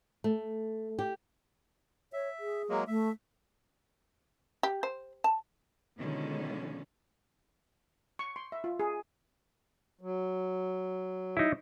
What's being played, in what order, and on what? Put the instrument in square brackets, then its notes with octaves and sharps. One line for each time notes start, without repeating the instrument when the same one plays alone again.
[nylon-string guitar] A3
G4
[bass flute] C#5 [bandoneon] E5
[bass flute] G#4
[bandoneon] F#3 G#3 A#3
[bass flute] A3 [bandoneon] E5
[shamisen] G4
C5
A5
[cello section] B2 D3 D#3 F3 G#3 C#4
[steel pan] C#6
C6
E5
F4
G#4
[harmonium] F#3
[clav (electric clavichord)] D#4 E4